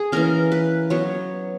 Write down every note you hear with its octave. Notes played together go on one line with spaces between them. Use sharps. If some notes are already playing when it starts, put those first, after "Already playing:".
Already playing: G#4
E3 A#3 C#4 A#4
B4
F#3 B3 C#5